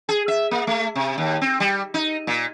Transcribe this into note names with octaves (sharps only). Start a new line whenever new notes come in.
G#4
E5
A#3
A3
C3
D#2
C4
G3
D#4
A#2